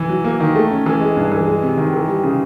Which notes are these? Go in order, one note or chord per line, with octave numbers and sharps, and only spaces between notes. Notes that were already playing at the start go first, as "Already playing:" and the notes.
Already playing: E3
F#3
A#3
D#3
A3
C#4
E3
G#3
G2
E3
G#3
C3
D#3
E3
G3
C#3